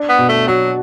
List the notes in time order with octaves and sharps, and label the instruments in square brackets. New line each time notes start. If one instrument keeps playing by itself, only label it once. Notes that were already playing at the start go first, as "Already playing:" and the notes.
Already playing: [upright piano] D4
[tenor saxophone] B3
[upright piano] B2
[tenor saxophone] A3
[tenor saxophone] F#3 [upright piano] F#4